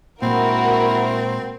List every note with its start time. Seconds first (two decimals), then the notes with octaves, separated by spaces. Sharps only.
0.22 A#2 G#3 C4 E4 F#4 A#4